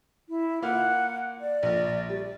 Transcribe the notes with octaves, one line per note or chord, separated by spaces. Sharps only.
E4
A#3 F4 F#5 F6
D5
A#1
G3 D5